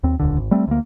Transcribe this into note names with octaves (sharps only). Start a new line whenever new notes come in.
D#2 C4
D#1 C#2 D3
G#1
G3 A3 C4
D2 A#3